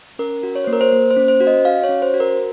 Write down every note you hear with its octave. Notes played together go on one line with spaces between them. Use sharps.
C#4 A#4
F#4
C#5
A#3 C5
A#4
C5
A#3
C5
C#4
C5
F#4
D#5
F#4 F5
C#5
C#4
C5
F#4
A#4